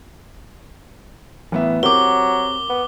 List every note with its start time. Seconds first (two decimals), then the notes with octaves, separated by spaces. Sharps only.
1.52 A1 B3 E5
1.83 F#3 C4 G4 A#4 D6 G7
2.70 B3